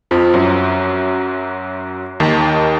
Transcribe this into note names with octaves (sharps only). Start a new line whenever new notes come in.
F2 F3
F#2 F#3
D#2 D#3